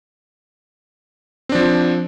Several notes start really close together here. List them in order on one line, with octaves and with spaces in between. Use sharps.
C4 D4 F3